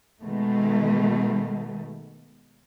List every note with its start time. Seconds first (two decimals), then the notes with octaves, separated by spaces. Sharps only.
0.22 B2 D#3 G#3 A3